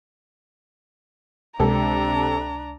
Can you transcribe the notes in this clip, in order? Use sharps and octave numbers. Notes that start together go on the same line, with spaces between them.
C#2 C3 G#3 D4 A4 A#5